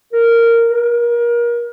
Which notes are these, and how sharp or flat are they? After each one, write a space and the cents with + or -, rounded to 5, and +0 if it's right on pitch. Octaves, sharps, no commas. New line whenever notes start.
A#4 -10
A#4 +30